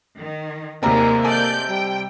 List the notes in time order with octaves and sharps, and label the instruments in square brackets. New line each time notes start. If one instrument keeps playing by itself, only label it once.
[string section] D#3
[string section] D#2 G#3 [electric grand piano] C3 C4 [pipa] G3 A#4 [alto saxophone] A#3
[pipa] G#3 G#4 A4 [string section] D5 G6
[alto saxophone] G3 [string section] G5